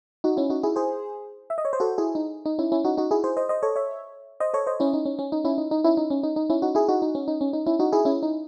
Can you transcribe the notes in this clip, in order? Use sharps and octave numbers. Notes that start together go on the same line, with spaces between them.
D#4 F#4
C#4 E4
D#4 F#4
E4 G#4
G#4 C5
E5
D#5
C#5
C5
F#4 A4
E4 G#4
D#4
D#4
C#4 E4
C#4 E4
D#4 F#4
D#4 F#4
E4 G#4
G#4 C5
C5 D#5
C5 D#5
A4 C#5
C#5 E5
C5 D#5
A4 C#5
C5 D#5
C#4 E4
D#4
C#4
C#4
D#4
C#4 E4
D#4
D#4
C#4 E4
D#4
C#4
D#4
D#4
C#4 E4
D#4 F#4
E4 G#4
D#4 F#4
D#4
C#4
D#4
C#4
D#4
C#4 E4
D#4 F#4
E4 G#4
C#4 E4
D#4